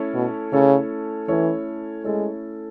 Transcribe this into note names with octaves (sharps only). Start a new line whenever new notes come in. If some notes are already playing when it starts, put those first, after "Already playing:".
Already playing: A3 C#4 E4 A4 C#5
B2
C#3 A3 C#4 E4 A4 C#5
E3 A3 C#4 E4 A4 C#5
G#3 A3 C#4 E4 A4 C#5